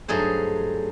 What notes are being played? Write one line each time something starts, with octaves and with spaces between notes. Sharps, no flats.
G2 F#3 A3 D#4 G#4 C5